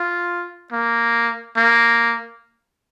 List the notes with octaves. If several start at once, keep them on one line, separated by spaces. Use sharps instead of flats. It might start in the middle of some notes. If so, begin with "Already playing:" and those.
Already playing: F4
A#3
A#3